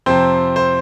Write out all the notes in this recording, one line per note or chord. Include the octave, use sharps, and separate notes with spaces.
F2 C3 F3 C4 C5
C5